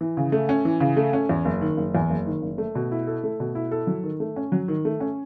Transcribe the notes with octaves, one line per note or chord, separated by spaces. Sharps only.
E3
C#3
A3
C#4
E3
C#3
A3
C#4
E2
F#1
D#3
F#1
E2
F#1
D#3
F#1
A3
B2
E4
A4
A3
B2
E4
A4
F#3
D#3
A3
C#4
F#3
D#3
A3
C#4